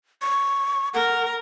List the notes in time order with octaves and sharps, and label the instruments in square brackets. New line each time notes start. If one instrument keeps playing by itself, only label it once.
[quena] C#6
[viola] A#4 [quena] F#5